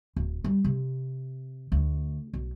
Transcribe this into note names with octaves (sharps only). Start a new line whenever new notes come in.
D1
G3
C3
D2
B1